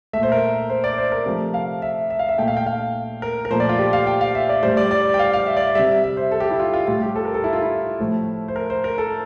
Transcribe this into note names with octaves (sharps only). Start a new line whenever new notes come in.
A#2 A3 E5
C5
A#4
C5
D5
C5
A#4
C3 F3 A3
F5
E5
E5
F5
E5
A#2 A3 G5
F5
G5
F5
A#4
A#4
A#2 F3 A3 C5
D5
F4
G4
F5
G5
F5
E5
D5
A2 G3 C5
D5
D5
G5
F5
F5
E5
D5
C3 G3 E5
E5
C5
A4
G4
E4
F4
F4
A2 G3 F4
G4
A4
A#4
A4
E4
F4
E4
A2 F3 A3
C5
A#4
C5
A#4
A4